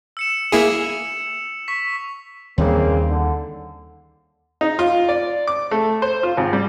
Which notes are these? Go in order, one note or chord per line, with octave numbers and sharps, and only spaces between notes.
E6 C#7 E7
A#3 E4 G#4 F7
C#6 B6
D#2 C#3 G3 A#3 C4
D3
D#4
F4
D5
D6
A3
C5
F4
G#1
G3